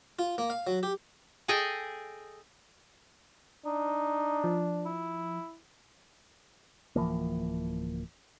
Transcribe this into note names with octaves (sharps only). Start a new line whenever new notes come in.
F4
A#3
F5
F#3
G4
G#4 A4 D#5 G5 G#5
D4 D#4
F3
E4
D1 E3 F3 A#3